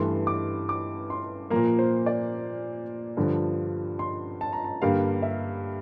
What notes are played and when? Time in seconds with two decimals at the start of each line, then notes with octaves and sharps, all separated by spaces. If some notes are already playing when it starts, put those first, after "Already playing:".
Already playing: G2 E3 A3 C6
0.27 D6
0.69 D6
1.10 C6
1.50 A#2 F3 A#3 A#5
1.79 C5
2.06 D5
3.17 G2 D3 F3
3.99 C6
4.41 A5
4.53 A#5
4.64 A5
4.82 G2 D3 G3 A#3 F5
5.22 E5